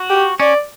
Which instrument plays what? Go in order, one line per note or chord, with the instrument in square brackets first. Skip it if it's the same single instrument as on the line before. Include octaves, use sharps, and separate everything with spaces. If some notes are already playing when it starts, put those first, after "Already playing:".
Already playing: [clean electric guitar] F#4
[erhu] G4
[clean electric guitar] C#4 [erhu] D5